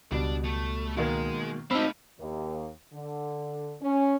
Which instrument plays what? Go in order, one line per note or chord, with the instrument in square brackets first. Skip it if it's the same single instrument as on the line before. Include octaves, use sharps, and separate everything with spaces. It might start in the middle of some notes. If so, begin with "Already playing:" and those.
[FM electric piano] C#2 [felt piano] B2 G3 [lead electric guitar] D4
[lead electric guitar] A3
[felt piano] B2 D#3 A#3 [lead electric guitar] G#3
[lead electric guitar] A3 F5 [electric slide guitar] C4 D#4 [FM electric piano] B5 [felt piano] E6
[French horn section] D#2
D3
C#4